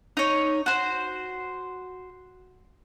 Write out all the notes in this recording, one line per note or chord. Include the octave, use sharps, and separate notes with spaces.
D#4 C#5
F#4 C5